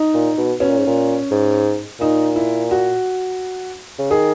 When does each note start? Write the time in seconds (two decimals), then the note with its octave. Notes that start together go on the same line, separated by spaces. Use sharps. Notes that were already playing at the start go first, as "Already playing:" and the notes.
Already playing: D#4
0.14 A#2
0.38 B2
0.60 B2 C#4
0.69 A#2
0.78 G#2
0.87 A#2
1.31 G#2
2.00 A#2 D#4
2.36 E4
2.71 F#4
3.99 C#3
4.11 D#3 G#4